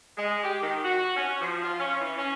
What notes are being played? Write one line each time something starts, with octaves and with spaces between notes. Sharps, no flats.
G#3
G4
D#3
F#4
C#4
F3
F4
C#4
E3
C#4